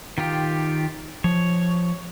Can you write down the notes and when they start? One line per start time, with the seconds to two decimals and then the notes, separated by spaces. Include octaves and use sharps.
0.18 D#3 F4 G4
1.24 F3 C#5